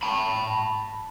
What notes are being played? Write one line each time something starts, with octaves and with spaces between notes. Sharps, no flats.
A5 B5